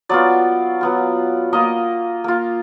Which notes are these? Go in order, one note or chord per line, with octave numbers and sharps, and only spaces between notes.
F#3 B3 F4 D5
F#3 B3 F4
A#3 F4 D#5
A#3 F4